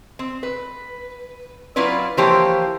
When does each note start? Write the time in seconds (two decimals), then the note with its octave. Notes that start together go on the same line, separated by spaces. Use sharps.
0.19 C4
0.43 B4
1.76 F#3 C#4 E4 F4 B4 D5
2.17 E3 F3 A#3 G4 C5 C#5